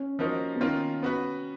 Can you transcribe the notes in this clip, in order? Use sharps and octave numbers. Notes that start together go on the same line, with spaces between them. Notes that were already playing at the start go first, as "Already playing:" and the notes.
Already playing: C#4
F3 A#3 D#4 F#4 A#4
B3
D#3 A#3 C#4 F4
B3 F#4 B4